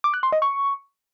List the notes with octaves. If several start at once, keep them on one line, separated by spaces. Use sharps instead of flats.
D6
F#6
C6
D#5
C#6